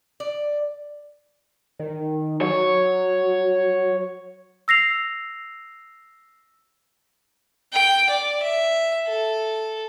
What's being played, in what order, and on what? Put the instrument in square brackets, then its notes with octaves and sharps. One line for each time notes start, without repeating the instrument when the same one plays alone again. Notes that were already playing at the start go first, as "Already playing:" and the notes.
[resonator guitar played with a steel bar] D5
[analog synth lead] D#3
[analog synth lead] F#3 [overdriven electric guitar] C#5
[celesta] E6 A#6 C7 F7
[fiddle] G5
D5
E5
A4